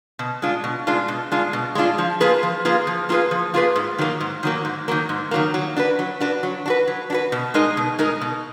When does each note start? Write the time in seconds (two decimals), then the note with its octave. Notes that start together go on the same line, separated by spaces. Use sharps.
0.19 B2
0.42 G#3 D4 F4
0.64 B2
0.87 G#3 D4 F4
1.08 B2
1.32 G#3 D4 F4
1.53 B2
1.75 G#3 D4 F4
1.98 F3
2.20 A#3 F4 G#4 B4
2.43 F3
2.65 A#3 F4 G#4 B4
2.87 F3
3.09 A#3 F4 G#4 B4
3.31 F3
3.54 A#3 F4 G#4 B4
3.76 G#2
3.98 D#3 F#3 A#3
4.20 G#2
4.43 D#3 F#3 A#3
4.65 G#2
4.88 D#3 F#3 A#3
5.09 G#2
5.31 D#3 F#3 A#3
5.54 F#3
5.76 D4 F#4 B4
5.99 F#3
6.20 D4 F#4 B4
6.43 F#3
6.66 D4 F#4 B4
6.88 F#3
7.10 D4
7.12 F#4 B4
7.32 B2
7.54 G#3 D#4 A#4 D#5
7.77 B2
7.99 G#3 D#4 A#4 D#5
8.21 B2